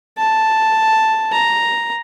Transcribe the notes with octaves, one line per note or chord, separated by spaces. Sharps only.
A5
A#5